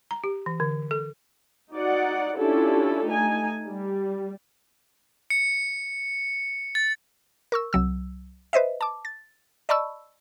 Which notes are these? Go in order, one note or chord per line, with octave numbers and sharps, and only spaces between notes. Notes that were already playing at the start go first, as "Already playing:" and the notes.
A#5
G4
E3
D3
A4
D#4 F#4 D5 F#5
C#4 D4 E4 F4 G4 A4
A3 D#4 G#5
G3
C#7
A6
A#4 C#6 E6
C2 F#3 E6
B4 C5 D#5 E5
A5 D6
A6
D5 D#5 A5 B5 C#6 E6